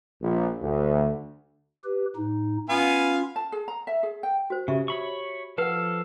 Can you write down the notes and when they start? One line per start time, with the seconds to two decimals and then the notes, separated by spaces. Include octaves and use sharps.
0.21 A#1
0.62 D2
1.84 G4 B4
2.16 A2 D#4
2.69 B3 C#4 F4 F5 G#5
3.36 A5
3.52 G#4
3.68 A#5
3.87 E5
4.03 G#4
4.23 G5
4.50 F#4 C5
4.68 C#3 F#4 G4 E5
4.88 C#5 B5 C#6
5.58 F3 A4 B4 F5 F#5